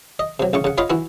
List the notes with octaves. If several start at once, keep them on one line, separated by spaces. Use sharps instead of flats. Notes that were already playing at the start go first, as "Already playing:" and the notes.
D#5
C3 F#3
A1 C#3 C#6
C#3 F#5
F4 C#5 D#5 F5 B5 C6
E3 E4 F#4